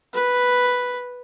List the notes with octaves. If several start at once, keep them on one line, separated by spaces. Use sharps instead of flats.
B4